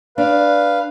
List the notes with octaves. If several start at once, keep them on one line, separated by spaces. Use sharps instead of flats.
D4 B4 F5